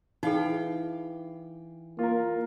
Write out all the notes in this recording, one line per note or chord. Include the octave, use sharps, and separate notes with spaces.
E3 D#4 G#4 F5 G5
A#3 F4 A#4